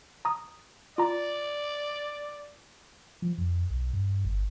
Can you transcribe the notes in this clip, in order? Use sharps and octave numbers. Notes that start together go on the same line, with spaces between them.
A#5 D#6
F4 D5 A#5
F3
F2
B1
G2
G1